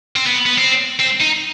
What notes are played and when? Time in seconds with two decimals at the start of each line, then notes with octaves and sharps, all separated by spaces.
0.16 C4
0.27 B3
0.46 B3
0.58 C4
1.00 C4
1.21 D#4